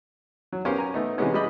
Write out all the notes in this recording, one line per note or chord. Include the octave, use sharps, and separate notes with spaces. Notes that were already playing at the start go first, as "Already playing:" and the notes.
F#3
B3 C#4 G4 A#4 C5 F5
G#5 A#5
A3 B3 D#4
C3 E3 G#3 B3 C#4
G3 G#3 G4 D#5 B5